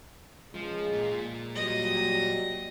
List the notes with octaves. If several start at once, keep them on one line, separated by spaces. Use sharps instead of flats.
C#2 F3 G#3
A#2 F4
F#3 G3 D#5